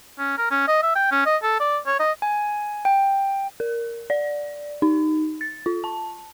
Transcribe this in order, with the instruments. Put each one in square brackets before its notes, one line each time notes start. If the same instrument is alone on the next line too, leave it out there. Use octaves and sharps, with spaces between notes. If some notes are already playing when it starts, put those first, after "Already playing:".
[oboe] C#4
A#4
C#4
D#5
E5
G5
C#4
D#5
A4
D5
C#5
D#5
[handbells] G#5
G5
[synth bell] A#4
D5
D#4
A6
F4
A5